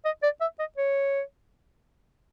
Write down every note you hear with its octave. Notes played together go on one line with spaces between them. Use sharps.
D#5
D5
E5
D#5
C#5